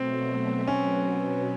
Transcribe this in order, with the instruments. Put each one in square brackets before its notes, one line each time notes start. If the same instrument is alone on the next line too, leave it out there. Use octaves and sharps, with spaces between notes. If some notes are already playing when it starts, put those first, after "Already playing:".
Already playing: [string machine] B2 F#3 A3 [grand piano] C4
[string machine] B2 F#3 B3 [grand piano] C#4